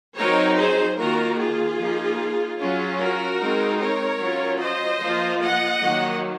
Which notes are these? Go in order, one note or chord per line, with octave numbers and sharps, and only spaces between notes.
F#3 C4 D#4 A#4 C#5
G#4 C5
D#3 A#3 F4 F#4 A#4
F4 G#4
F3 A#3 D#4
F#3 C#4 F4
F#4 A#4
G#3 C4 D#4
A#4 C#5
F#3 C#4 F4
C5 D#5
F3 A#3 F4
D#5 F#5
D#3 F#3 A#3